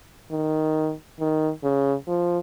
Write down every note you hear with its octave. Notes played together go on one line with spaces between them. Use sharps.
D#3
D#3
C#3
F3